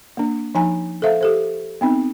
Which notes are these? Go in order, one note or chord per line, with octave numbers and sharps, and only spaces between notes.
A#3 D4
F3 D#4 G#5 A#5
A4 C5 E5 F5
G4 A4 C5
B3 C4 D#4